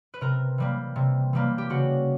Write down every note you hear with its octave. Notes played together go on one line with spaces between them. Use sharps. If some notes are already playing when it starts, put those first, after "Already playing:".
B4
C3 A#4
E3 G3 A#3
C3
E3 G3 A#3
G4
C#3 F#4